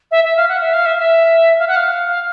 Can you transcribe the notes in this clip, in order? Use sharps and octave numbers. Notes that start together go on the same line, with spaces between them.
E5
E5
F5
F#5
E5
F5
E5
E5
F5
F#5
F5
F5